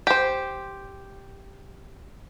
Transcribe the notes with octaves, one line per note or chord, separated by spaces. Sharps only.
G4 C5